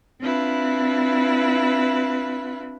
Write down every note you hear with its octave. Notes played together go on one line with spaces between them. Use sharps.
C4 D4 E4 F4 B4